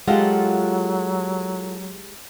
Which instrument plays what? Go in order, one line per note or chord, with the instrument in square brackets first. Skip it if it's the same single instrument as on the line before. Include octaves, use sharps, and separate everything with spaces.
[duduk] F#3 [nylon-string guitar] G#3 G4 [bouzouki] F4 A4 F#5